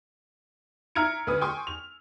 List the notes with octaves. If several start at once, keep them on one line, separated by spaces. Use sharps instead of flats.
E5 A#5 F6 G#6 C#7 D7
D2 B4 D#6
G5 G#5 C6 C#6 D#6
F7